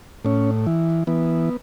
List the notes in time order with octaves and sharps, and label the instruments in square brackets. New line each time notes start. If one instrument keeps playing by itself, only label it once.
[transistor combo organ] A2 C#4
E3
E3 B3